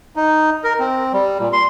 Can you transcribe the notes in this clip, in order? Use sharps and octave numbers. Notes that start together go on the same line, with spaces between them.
D#4
A#4
C4
G3
A#2
C6